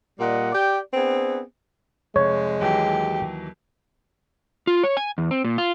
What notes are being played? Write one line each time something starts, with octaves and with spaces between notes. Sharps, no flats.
A#2 G3 D#5 F#5
G4 D5 G5
B3 C4 D4 G#4
F1 G#3 C#5
D#2 E3 F#3 G4
F4
C#5
G#5
E2
C4
A#2
F4